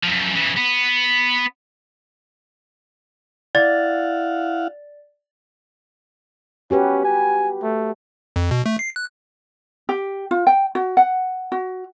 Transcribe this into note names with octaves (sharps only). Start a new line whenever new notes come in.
F#2 F3
C#3 E3
B3
E4 D5 F5 F#5 A6
C#4 F#4 G4 B4
G#5
A3
F2
B2
A3
C7
F#6
G4
F4
G5
F#4
F#5
F#4